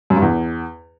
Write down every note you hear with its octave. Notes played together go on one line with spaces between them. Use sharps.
F#2
G2
E2